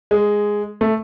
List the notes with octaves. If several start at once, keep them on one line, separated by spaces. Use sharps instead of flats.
G#3
A3